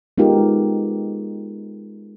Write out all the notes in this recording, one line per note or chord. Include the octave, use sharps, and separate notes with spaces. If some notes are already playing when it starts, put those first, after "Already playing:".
G#3 B3 D#4 F4 G4 A#4